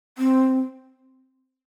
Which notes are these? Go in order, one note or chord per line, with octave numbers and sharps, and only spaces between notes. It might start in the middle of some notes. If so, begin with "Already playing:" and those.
C4